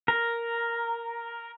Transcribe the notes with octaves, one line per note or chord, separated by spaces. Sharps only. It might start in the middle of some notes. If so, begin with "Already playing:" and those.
A#4